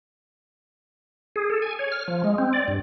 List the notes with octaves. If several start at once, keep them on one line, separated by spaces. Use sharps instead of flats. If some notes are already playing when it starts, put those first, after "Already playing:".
G#4
A4
G#5
C#5
F6
F3
G#3
C4
D5
G2